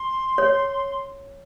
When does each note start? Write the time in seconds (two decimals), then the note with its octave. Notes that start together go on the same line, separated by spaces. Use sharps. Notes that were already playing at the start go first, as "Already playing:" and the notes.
Already playing: C6
0.38 C#5